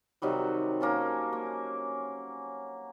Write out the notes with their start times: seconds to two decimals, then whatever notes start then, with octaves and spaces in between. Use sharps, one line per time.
0.22 C3 D#3 F#3 G3
0.81 A#3 C#4 A4
1.33 A#3